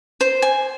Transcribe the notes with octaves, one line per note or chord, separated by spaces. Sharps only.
C5
G#5